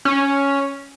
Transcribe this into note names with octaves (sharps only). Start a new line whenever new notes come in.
C#4